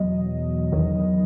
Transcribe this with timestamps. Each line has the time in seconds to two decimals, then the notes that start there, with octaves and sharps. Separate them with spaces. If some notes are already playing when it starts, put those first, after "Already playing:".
Already playing: E2 B2 F#3 D#5
0.72 E2 D#3 F#3